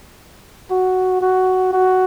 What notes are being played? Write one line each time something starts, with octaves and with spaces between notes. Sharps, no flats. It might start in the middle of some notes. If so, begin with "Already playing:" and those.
F#4
F#4
F#4